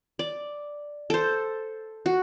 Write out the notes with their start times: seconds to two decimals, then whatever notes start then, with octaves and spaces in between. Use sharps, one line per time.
0.19 D5
1.10 A4 C5
2.06 F#4